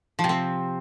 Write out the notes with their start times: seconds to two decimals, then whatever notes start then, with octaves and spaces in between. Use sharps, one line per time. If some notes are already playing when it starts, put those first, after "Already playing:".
0.19 F3
0.24 C3
0.29 C4